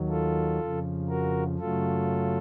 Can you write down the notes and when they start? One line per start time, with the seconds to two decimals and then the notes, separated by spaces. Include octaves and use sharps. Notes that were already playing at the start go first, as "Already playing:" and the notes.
Already playing: D#2 D#3 F#3
0.09 F4 A4
0.59 F2 C#3 F3
1.09 F#4 A#4
1.59 F#2 C#3 F#3 A3 F4 A4